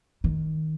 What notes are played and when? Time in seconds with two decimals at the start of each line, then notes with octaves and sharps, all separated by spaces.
0.24 D#3